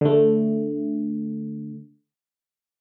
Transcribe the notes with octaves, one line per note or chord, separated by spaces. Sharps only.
D3 A3